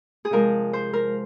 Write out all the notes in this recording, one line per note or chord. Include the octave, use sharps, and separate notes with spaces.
G#4
C3 F3 G#3 A#4
C5
A#4